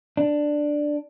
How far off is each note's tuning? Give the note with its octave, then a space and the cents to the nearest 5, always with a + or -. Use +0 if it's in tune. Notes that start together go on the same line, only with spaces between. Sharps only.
D4 +5